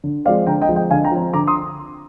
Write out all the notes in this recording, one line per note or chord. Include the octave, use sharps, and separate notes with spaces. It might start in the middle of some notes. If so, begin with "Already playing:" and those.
D3
F3 G#3 C4 D5 F5
D3 G5 A#5
D#5 G5
F3 G#3 C4
D#5 G5
D3 F5 G#5
G5 A#5
F3 C4
D3 A#5 D6
C6 D#6